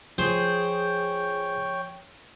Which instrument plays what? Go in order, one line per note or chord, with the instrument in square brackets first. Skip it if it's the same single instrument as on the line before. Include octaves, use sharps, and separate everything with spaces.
[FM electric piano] F3 [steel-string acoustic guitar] G#4 [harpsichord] C5 [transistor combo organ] C#5 G5